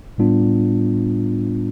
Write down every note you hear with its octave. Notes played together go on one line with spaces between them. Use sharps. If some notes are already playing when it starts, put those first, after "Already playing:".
A2 G3 B3 D4 F4